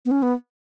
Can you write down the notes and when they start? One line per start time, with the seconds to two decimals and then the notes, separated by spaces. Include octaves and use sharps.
0.05 B3
0.11 C#4
0.22 B3